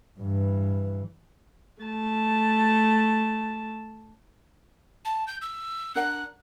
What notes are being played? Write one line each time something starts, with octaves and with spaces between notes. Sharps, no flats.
G2 E3
A3 A5
A5
G6
E6
D4 A#4 F#5 F#6